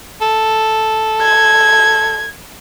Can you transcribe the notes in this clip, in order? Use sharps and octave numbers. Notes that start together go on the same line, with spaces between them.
A4
G#6